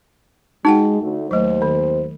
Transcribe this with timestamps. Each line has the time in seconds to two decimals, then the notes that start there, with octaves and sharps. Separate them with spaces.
0.65 G#3 D#4 F#4 F#5 G5
1.01 D2 A3
1.31 D#2 F#3 A3 C5
1.62 D#3